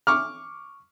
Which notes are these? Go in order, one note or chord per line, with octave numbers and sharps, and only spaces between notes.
C#6 D6 F6